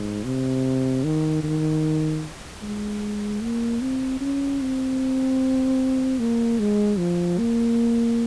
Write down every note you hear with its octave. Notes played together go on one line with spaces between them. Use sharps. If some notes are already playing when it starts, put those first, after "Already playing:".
Already playing: G#2
C3
D#3
D#3
G#3
A#3
C4
C#4
C4
A#3
G#3
F3
A#3